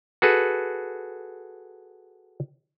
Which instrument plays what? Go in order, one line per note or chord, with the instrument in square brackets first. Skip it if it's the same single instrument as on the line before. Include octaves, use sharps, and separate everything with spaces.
[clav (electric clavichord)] F#4 G#4 A4 B4